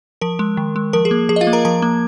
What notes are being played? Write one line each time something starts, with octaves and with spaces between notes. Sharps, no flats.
F3 A#4
G#3
D#3
G#3
F3 A#4
G#4
A#3
F3 G#4
D#5
F4 F5
A#3
A#4 A#5
F3 A#4 A#5
A#3